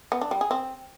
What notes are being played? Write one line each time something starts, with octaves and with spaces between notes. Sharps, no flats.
B3
D4
G3
G#4
C4